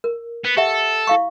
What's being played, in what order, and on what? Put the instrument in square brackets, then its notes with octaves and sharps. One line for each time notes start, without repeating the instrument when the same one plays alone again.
[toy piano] A#4
[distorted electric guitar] B3
[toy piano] G4 E5 F#5 [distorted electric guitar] A4
[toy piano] E4 F5 C#6